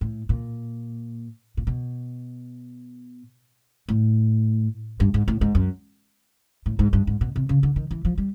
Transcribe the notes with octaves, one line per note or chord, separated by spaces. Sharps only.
A2
A#2
A#2
B2
A2
G2
G#2
A2
G#2
F#2
A2
G#2
G2
G#2
B2
C3
C#3
D3
D#3
E3
F3
G3